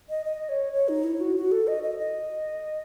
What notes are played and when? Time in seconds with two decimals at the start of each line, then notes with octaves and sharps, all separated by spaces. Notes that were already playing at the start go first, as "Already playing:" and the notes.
0.09 D#5
0.26 D#5
0.49 C#5
0.73 C#5
0.89 D#4
1.04 E4
1.20 F#4
1.36 F#4
1.52 A4
1.67 D#5
1.83 D#5
2.00 D#5